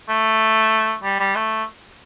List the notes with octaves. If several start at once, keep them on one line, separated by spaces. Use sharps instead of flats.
A3
G3
G3
A3